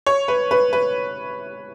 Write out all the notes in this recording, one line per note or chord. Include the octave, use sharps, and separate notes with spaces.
C#5
B4
B4
B4